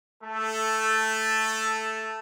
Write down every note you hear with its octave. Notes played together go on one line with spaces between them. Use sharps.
A3 A4